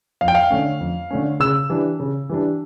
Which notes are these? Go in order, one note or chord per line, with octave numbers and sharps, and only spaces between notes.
F2 F5
G5
F5
D3 A3 C#4
F2
D3 A3 C#4
C#3 E6
E3 G3 D4
C#3
E3 G3 D4